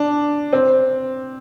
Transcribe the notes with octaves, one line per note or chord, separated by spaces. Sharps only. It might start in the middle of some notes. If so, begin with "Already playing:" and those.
Already playing: D4
C4